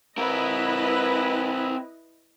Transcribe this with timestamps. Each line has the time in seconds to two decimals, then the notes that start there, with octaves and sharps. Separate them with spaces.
0.18 C4 E4 A#4 B4 D#5